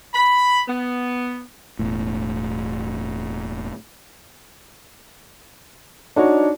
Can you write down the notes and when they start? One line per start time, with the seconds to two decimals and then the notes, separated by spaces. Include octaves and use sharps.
0.14 B5
0.68 B3
1.79 E1 A2
6.16 D4 D#4 F#4 C#5